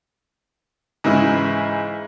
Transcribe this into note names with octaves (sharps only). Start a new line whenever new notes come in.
G#2 C#3 E3 E4